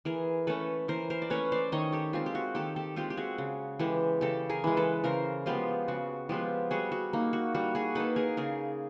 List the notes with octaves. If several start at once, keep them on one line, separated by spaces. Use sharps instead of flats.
E3 G#4 A#4
A3 C#4 A4 B4
E3 A#4 C5
A#4 C5
D5
A3 C#4 B4 C#5
C5 D5
D#3 C#5 D#5
G4 A4
G#3 C4 F4
G4
F#4
D#3 G4 A4
G4 A4
G#3 C4 F4 G4
G4
F#4 G#4
C#3
E3 G#3 G4 A4
C#3 G4 A4
G#4 A#4
E3 G#3
A4 B4
C#3 A#4 C5
F3 G#3 B3 F4 G4
C#3 F#4
F3 G#3 B3 F4 G4
G3 F#4 G#4
F#4
A#3 D#4
F#4
G3 F#4
F#4 G#4
A#3 D#4 A4 B4
G#4 A#4
C#3 G#4 A#4